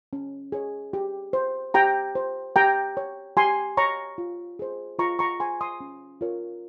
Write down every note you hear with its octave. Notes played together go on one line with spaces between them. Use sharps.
C#4
G#4 C#5
G4
C5
G4 G5 A#5
C5
G4 G5 A#5
C#5
G4 G#5 C6
C#5 A#5 C#6
F4
G#4 C5
F4 A#5 C#6
A#5 C#6
G#4 C5 G#5 C6
C6 D#6
C#4
F4 A#4 C#5